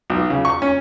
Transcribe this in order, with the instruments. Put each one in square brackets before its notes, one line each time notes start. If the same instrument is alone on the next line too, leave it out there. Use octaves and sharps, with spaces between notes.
[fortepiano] B1
C#3
C#6
C#4